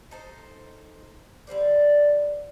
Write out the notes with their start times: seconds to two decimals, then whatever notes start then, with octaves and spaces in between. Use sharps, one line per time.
0.11 D#4 A4 C5
1.47 D3 G3 C5 D5